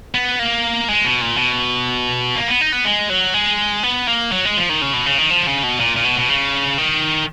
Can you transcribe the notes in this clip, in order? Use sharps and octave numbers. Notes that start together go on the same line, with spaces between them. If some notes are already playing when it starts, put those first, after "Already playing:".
B3
A#3
G#3
B2
A#2
B2
A#3
B3
D#4
B3
G#3
F#3
G#3
B3
A#3
F#3
G#3
F3
D#3
C#3
B2
C#3
D#3
F3
C#3
B2
A#2
A#2
B2
B2
C#3
D#3